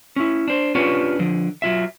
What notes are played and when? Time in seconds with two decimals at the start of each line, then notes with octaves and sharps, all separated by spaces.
0.16 C#4 E4
0.48 D4 C5
0.75 C#4 D4 F4 G4 B4 C#5
1.19 D3 F3
1.62 F#3 F4 E5